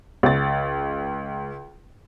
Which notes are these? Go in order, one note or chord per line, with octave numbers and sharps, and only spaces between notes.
C#2 A6